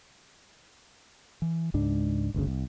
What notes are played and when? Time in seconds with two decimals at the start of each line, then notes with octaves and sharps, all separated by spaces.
1.42 E3
1.74 C#2 G#2 D4
2.34 G1 D2 A#2 C#3
2.47 C2